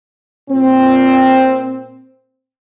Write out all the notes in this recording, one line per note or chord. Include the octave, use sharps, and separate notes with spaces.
A#2 C4